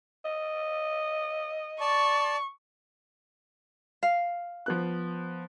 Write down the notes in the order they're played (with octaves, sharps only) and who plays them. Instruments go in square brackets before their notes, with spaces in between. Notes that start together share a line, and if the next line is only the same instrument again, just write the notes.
[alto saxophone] D#5
[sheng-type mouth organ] D5 A5 [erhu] C#6
[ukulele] F5
[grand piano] F3 B3 F#6